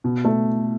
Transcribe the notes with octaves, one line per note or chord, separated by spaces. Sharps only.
B2
A3